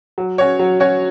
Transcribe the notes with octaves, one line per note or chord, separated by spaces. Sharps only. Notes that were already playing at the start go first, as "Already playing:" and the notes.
F#3
C#4 F#4 C#5
F#3
C#4 F#4 C#5